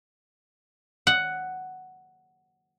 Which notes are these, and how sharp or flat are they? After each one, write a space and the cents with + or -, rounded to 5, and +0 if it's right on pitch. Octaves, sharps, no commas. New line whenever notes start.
F#5 +5